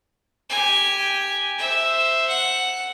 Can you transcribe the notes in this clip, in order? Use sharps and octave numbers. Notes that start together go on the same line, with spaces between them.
G4 G#5
C5 E5
F#5